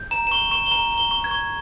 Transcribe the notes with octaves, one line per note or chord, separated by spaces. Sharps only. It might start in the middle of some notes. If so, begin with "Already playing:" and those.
Already playing: G6
A#5 E7
E7
C#6 G7
C#6 E7
G7
A#5 E7
A#5
G7
C#6
G#6
C#6